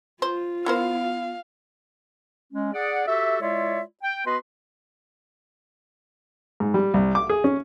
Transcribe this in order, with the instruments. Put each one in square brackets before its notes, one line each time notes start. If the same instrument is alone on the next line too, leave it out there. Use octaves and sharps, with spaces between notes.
[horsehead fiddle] F4 [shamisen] C5
[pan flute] B3 [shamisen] E4 A#4 C5 [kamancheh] F5
[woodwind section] G#3 C#4
G#4 D5 F#5
F#4 G4 A4 E5
G#3 E4 F4 C#5 D5 E5
G5
B3 F#4 B4 D#5 C6
[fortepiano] G#2
G3
C2
D6
G#4
C#4